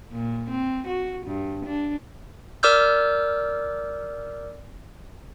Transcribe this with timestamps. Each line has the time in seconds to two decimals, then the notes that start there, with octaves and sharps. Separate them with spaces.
0.12 A#2
0.51 C4
0.87 F#4
1.26 G2
1.66 D4
2.63 A#4 D5 D6 E6 F6 G6